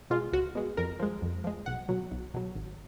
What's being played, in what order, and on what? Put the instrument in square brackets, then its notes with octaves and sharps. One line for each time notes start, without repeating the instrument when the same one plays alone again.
[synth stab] B2 G#3 F4
C#2 F#4
B2 G#3
F2 A#4
F3 G#3
F2
F3 G#3
B1 F#5
B2 F#3
B1
B2 F#3
G#1